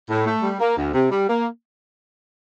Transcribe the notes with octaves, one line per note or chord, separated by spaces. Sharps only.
A2
A3
G3
A#3
D2
C3
G3
A#3